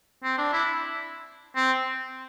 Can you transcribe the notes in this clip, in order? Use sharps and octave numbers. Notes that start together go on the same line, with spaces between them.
C4
D4
E4
C4